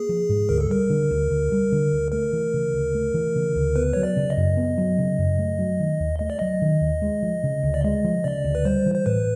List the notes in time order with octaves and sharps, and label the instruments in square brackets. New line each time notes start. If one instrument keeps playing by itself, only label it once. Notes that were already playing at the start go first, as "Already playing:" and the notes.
Already playing: [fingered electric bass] A#3 [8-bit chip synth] G#4
[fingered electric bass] F3
G#2
[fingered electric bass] D2 [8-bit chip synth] A#4
[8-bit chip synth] A4
[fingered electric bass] G3 [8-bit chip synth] A#4
[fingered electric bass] D3
D2
D2
G3
D3
D2
[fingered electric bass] A3 [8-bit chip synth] A#4
[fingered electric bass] E3
C#3
D2
A3
E3
C#3
D2
[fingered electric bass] B3 [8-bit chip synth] B4
[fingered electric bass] F#3 [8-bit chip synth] C#5
[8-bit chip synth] D5
[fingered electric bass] C#3
[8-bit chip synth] D#5
[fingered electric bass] F#2
B3
F#3
C#3
F#2
A3
F#3
D#3
D#2
[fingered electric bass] A3 [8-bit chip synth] D#5
[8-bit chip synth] D5
[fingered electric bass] F#3 [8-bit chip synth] D#5
[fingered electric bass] D#3
D#2
G#3
F3
C#3
D2
[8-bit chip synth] D5
[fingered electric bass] G#3 [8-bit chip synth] D#5
[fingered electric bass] F3
[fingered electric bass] C#3 [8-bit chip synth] D5
[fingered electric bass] D2
[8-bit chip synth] B4
[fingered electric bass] G3 [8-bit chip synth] C5
[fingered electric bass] E3
[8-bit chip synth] C5
[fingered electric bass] A2 [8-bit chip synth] B4